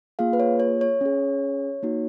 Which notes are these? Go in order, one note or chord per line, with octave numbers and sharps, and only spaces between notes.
A#3 F4 G#4 F5
B4
C#5
C#5
C#5
C#4 G#4
A#3 D#4 F#4